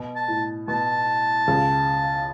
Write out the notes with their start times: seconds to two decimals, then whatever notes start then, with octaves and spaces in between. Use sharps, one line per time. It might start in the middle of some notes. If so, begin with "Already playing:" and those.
Already playing: B2
0.16 A5
0.28 A2
0.68 B2 A5
1.48 C#2 C#3